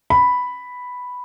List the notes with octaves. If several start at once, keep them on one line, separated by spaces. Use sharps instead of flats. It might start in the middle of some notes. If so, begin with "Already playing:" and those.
B5